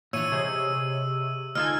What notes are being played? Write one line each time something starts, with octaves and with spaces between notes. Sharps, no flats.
A#2 E3 D4 C#5 E6 D#7
C3 G#4 C5 D#5
D2 D#4 F4 A4 G#5 F6 G#6